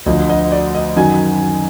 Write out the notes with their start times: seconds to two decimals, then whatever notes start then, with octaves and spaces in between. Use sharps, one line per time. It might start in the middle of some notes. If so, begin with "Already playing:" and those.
0.06 D2 D3 F3 D#5
0.30 D#5
0.52 D5
0.75 D#5
0.96 F#2 D#3 F#3 G#5